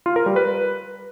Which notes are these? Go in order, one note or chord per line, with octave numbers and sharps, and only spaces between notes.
F4
A#4
G3
B4